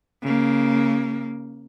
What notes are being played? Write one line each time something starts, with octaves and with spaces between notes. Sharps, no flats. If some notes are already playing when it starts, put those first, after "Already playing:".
C#3 A#3